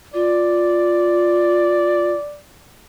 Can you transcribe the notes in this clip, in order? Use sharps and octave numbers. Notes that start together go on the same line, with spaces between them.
F4 D5